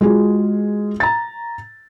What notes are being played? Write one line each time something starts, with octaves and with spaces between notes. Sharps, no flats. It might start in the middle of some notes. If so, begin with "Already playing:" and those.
G#3 F4 F#4 G#4
A#5 A6